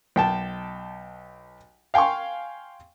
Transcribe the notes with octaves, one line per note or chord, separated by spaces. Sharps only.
B1 G5 A5
F5 G5 G#5 C6 C#6